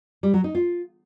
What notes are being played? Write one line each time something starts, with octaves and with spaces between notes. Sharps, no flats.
G3
F#3
D#4
F4